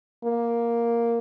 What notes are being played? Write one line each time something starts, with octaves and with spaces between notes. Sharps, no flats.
A#3